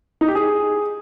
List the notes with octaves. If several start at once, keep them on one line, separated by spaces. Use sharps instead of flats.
D#4
G4
G#4